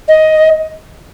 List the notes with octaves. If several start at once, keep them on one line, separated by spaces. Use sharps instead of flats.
D#5